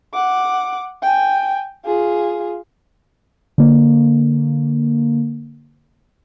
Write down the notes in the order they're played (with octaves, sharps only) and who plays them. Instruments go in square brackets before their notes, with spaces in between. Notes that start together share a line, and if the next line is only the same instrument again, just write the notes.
[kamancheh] F#5 D6
G5 G#5
F4 G#4
[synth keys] D3 A#3